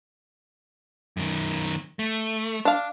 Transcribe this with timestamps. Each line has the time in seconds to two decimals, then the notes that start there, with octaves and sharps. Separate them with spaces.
1.17 F#2 D#3
1.99 A3
2.65 D4 F5